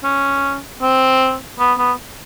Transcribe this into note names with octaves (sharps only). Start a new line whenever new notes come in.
C#4
C4
B3
B3